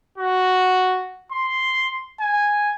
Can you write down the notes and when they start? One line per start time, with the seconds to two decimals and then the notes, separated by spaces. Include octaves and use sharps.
0.18 F#4
1.32 C6
2.20 G#5